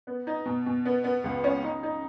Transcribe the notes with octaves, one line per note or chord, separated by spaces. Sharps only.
B3
D#4
B2
B2
B3
B3
C#2
C#4
D#4
D#4